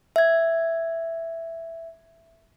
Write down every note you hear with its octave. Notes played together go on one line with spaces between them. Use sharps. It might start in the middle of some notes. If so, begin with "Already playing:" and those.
E5 G#6